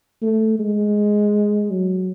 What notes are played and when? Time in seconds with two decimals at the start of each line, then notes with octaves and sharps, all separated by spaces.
0.22 A3
0.60 G#3
1.70 F#3